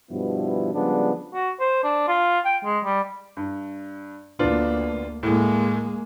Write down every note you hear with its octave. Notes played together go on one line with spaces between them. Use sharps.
G2 B2 F3 G3 B3 E4
C#3 F3 G3 G#3 B3 D4
F#4
C5
D4
F4
G5
G#3
G3
G2
D2 A#3 B3 D4 F4
A2 G#3 A#3